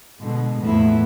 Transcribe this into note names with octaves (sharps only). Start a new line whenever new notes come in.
B2 D3 G#3
E2 A2 F3 A#3 B3 E4